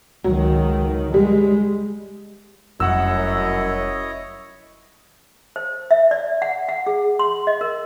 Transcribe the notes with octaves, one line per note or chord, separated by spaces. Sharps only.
C#2 D#3 F#3
G3 G#3
F1 F#2 G3 E4 C#5 D#5 F#5 E6
C5
E5
D5
F#5
F#5
G#4
C6
D#5
A#4